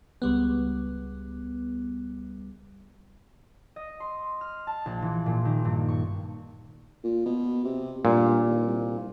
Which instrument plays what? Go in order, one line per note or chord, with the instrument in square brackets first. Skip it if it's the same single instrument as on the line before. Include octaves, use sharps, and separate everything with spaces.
[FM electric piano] C#2 G3 B3
[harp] D#5
C6
F6
A5
A#1
E3
A#2
D#3
G2
C#6
[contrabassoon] A#2
B2
C3
[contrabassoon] G2 [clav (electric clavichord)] A#2
[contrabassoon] D#2
C2